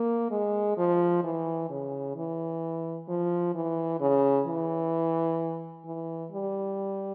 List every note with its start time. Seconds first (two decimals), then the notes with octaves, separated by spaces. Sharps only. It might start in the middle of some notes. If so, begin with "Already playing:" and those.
Already playing: A#3
0.31 G#3
0.77 F3
1.24 E3
1.70 C#3
2.16 E3
3.08 F3
3.55 E3
4.00 C#3
4.47 E3
5.85 E3
6.32 G3